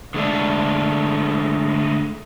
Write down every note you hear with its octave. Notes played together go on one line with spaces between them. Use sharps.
D3 G#3 A3 D4